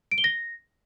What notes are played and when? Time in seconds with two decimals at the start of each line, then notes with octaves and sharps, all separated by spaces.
0.12 D7
0.18 G7
0.24 A#6